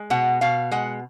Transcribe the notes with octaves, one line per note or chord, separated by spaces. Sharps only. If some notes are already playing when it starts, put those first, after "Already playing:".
Already playing: G#3
B2 F#5
B2 F5
G#3 F#5